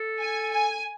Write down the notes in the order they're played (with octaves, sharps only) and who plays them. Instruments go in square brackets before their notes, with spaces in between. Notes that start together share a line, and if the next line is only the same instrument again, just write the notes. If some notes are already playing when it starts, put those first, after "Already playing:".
Already playing: [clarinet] A4
[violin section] G#5
G#5